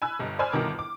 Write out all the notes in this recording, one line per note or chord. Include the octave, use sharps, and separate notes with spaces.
G#5 B5 E6 F#6
G1 G2 D#5
C5 D5 G#5 B5 E6 F6
G1 C2 B2 D#3 A#4 D6
D6